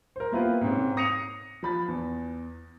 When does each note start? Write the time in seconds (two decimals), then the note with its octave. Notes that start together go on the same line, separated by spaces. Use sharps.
0.16 A#4 C5
0.32 A#3 B3 E4 F4 G4 B4
0.61 G#2 C3 C4 C#4
0.97 D#6 A#6 C7 C#7 D#7 F7
1.63 F3 B5 A6
1.88 E2